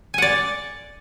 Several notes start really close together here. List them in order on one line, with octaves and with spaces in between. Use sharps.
G#5 F#5 D5